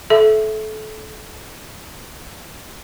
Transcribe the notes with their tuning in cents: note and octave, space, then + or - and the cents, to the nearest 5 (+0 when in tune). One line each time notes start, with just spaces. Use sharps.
A4 -30 E5 +0